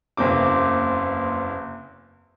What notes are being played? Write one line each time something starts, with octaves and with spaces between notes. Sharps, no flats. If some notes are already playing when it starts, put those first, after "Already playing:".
F#1 E2 A#3 C4 D6